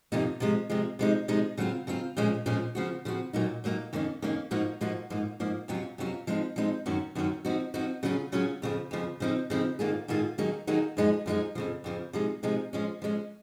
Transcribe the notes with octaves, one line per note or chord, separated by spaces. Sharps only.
F2 C3 F3 A#3 D#4
C3 F3 G#3
C3 F3 G#3
C3 F3 G#3 D#4
C3 F3 G#3 D#4
C#3 F#3 C4 F4
C#3 F#3 C4 F4
A#2 F3 G#3 C#4
A#2 F3 G#3 C#4
C#3 F3 C4 F#4
C#3 F3 C4 F#4
A#2 F#3 A#3 D#4
A#2 F#3 A#3 D#4
F2 D#3 A#3 C#4
F2 D#3 A#3 C#4
G#2 F3 A#3 D#4 F#4
G#2 F3 A#3 D#4 F#4
G#2 F3 A#3
G#2 F3 A#3
F2 C3 F#3 C#4 F4
F2 C3 F#3 C#4 F4
F3 G#3 C4 D#4
F3 G#3 C4 D#4
F#2 D#3 F#3 C#4
F#2 D#3 F#3 C#4
F3 C4 D#4 F#4
F3 C4 D#4 F#4
C#3 F#3 C#4 F4 G#4
C#3 F#3 C#4 F4 G#4
F2 C#3 F3
F2 C#3 F3
C#3 F3 C4 D#4
C#3 F3 C4 D#4
G#2 D#3 A#3 F4 G#4
G#2 D#3 A#3 F4 G#4
D#3 F#3 A#3 D#4 G#4
D#3 F#3 A#3 D#4 G#4
F#2 F3 G#3 D#4 G#4
F#2 F3 G#3 D#4 G#4
F2 C#3 F3
F2 C#3 F3
C3 F3 G#3 D#4 G#4
C3 F3 G#3 D#4 G#4
F3 G#3 C#4
F3 G#3 C#4